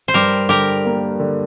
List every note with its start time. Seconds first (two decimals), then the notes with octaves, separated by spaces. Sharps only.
0.08 C5
0.14 G2 G4 A#4
0.49 D3 G4 A#4
0.85 A#3
1.20 D3